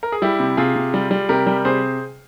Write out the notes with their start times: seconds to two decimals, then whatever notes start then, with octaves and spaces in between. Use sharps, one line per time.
0.03 A#4
0.12 G#4
0.22 G3 E4 G4
0.40 C3
0.57 C3 F4 G#4
0.76 C3
0.94 G3
1.11 G3
1.29 C3 G4 A#4
1.47 G3
1.65 C3 G#4 C5